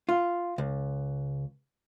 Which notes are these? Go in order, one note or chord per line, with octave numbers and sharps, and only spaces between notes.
F4
C#2